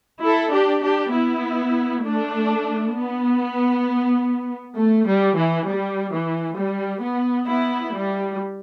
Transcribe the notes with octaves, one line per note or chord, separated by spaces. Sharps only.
E4 A4
D4 G4
D4 G4
B3 E4
A3 D4
B3
A3
G3
E3
G3
E3
G3
B3
B3 E4
G3